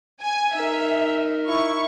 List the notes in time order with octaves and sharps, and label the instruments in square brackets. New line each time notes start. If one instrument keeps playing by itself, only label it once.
[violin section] G#5
[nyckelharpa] D#4 A#4 [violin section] E5
[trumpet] E4 [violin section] C#6